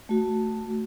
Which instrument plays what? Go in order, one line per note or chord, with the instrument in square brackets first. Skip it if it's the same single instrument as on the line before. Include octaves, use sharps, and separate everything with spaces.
[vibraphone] A3 F#4